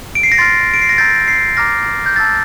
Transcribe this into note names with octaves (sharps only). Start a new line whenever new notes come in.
D7
C7
A#6
C6 F6 A6
D7
C7
A#6
A#5 E6 G6 A6
C7
A#5 D6 F6 A#6
G6
A5 E6 G6 A6